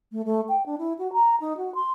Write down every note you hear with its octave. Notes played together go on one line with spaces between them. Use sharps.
A3
A3
G5
D4
E4
F#4
A#5
D#4
F#4
C6